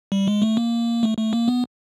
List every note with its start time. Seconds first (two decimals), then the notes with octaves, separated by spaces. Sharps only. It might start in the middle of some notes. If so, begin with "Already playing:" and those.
0.12 G3
0.27 G#3
0.42 A3
0.57 A#3
1.03 A3
1.18 A3
1.33 A#3
1.48 B3